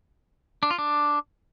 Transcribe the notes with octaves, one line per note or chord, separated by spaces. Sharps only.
D4
F4
D4